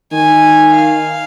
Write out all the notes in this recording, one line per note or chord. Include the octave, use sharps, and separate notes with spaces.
D#3 G#5
F5